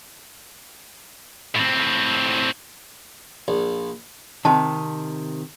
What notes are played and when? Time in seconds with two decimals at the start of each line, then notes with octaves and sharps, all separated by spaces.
1.55 A2 C4
3.48 A#1
4.45 C3 D#3 A5